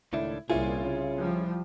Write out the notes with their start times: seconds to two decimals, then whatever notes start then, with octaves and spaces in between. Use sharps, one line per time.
0.13 C#2 A2 D#3 D4 E4
0.50 C2 A#2 C#4 E4 F4 G#4
0.83 C#3
1.18 F3 G3